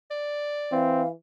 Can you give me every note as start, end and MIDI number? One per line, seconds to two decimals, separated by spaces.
0.11 0.82 74
0.72 1.12 52
0.72 1.03 60
0.72 1.08 77